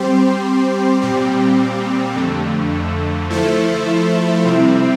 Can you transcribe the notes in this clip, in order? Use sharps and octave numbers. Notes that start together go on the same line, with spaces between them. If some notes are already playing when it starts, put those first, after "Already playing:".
Already playing: G3 C4 G4 C5
A#2 G3 C4 G4
F2 D3 A3
F3 A3 E4 A4 C5
C3 G3 C4 E4